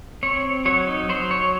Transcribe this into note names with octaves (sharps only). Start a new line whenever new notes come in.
C4 C#5
F#3 C#5
D#4
F#3 C5
C#5